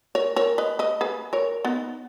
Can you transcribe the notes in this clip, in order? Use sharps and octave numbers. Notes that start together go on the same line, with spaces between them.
A#4 C#5
A#4 C#5
B4 D#5
B4 D#5
G#4 B4
A#4 C#5
B3 D#4